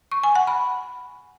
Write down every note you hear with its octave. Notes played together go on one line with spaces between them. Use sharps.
C#6
G#5
F#5
B5